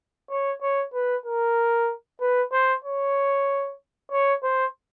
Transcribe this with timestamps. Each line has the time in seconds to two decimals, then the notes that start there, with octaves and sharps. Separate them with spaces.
0.30 C#5
0.62 C#5
0.94 B4
1.25 A#4
2.21 B4
2.52 C5
2.84 C#5
4.12 C#5
4.43 C5